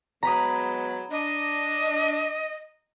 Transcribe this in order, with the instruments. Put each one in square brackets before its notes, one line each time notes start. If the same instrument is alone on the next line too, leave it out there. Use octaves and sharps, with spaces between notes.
[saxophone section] F#3 G#3 B3 [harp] A#5 B5 D#6
[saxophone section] D4 [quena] D#5